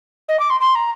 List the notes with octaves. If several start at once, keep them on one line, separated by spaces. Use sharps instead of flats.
D#5
D6
C6
C6
A#5